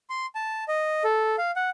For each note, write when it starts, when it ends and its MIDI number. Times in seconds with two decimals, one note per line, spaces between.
0.10 0.26 84
0.35 0.64 81
0.68 1.03 75
1.04 1.36 69
1.38 1.51 77
1.56 1.70 78